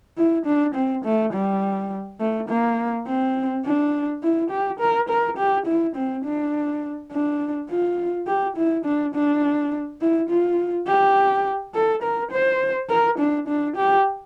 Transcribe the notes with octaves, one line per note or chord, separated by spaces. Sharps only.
E4
D4
C4
A3
G3
A3
A#3
C4
D4
E4
G4
A#4
A#4
G4
E4
C4
D4
D4
F4
G4
E4
D4
D4
E4
F4
G4
A4
A#4
C5
A#4
D4
D4
G4